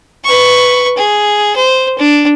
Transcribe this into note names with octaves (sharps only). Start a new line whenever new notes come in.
B4 C#6
G#4
C5
D4